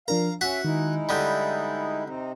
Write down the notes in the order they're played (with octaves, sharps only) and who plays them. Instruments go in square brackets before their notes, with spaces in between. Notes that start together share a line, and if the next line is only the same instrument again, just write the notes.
[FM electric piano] F3 D4 A#4 [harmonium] F5 [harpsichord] A#5
[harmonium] C#4 E5 [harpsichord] F#4 F#5 [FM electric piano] B6
[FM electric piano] D#3 [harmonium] G#3 D#4 E4
[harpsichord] D3 G3 [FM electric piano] B5 D#6 G6
[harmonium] C3 C4 D#4